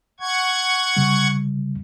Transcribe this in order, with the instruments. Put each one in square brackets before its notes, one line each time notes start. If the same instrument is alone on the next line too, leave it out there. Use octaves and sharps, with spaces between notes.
[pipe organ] F#5 C#6 G#6
[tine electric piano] C#3 G3